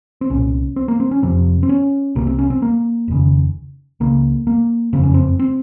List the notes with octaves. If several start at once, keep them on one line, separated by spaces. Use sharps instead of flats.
C4
C2 A#2 C#4
C4
A#3
C4
C#4
F1 F2 C3 C4
C4
C#4
C2 C3 A#3
C4
C#4
C4
A#3
F1 D#2 C#3
C#2 C#3 A#3
A#3
F#1 F2 C#3 C4
C#4
C4
C4